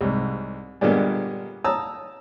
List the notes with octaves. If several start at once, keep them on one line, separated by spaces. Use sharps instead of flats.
C2 G#2
G2 A#2 D3 G#3 A#3 B3
A5 A#5 D#6 E6